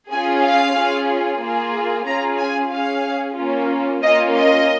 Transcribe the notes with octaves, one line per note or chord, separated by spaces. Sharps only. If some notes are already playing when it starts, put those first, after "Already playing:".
C#4 F4 G#4 G#5
F5
C#4 F4 G#4
A#3 F4 G#4
C#4 F4 G#4 A#5
G#5
C#4 G#4 F5
A#3 C#4 F4
A#3 C#4 F4 D#5
D#5